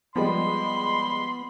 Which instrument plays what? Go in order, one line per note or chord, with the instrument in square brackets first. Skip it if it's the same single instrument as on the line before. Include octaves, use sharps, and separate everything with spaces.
[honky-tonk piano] F3 G3 G#3 [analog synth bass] B3 [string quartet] B5 [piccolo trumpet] C6